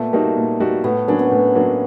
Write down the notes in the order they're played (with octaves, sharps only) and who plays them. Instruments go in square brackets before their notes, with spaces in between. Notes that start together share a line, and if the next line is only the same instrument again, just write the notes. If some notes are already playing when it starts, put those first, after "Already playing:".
Already playing: [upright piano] A#2 [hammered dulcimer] A3 B3
[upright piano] G3 A#3 D#4 F#4
A#2
G3 A#3 D#4 F#4
[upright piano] A2 [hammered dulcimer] B3
[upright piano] F#3 A#3 D4 [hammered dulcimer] C#4
[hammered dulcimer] B3
[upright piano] A2
F#3 A#3 D4